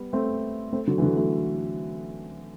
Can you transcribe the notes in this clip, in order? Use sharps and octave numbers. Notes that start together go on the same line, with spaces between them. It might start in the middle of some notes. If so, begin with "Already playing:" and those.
Already playing: G3 B3
A3 C4
A3 C4
D3 F#3
E3
D3 F#3
F#3 A3